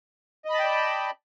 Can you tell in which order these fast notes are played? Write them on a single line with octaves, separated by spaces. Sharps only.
D#5 B5 A5 G5 D5